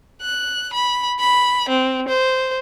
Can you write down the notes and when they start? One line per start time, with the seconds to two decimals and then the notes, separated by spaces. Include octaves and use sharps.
0.22 F#6
0.73 B5
1.20 B5
1.69 C4
2.08 C5